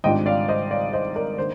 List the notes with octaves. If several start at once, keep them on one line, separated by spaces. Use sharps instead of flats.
G#1 G#2 G3 D4 F4 D#5 G5
D5 F5
C5 D#5
D5 F5
C5 D#5
A#4 D5
D#3 A#3 D4 C5